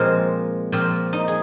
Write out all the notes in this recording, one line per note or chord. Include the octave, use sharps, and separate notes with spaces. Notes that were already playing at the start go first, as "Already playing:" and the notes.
Already playing: A#2 F3 G#3 C4 C5
A#2 F3 C4
D#4
G#4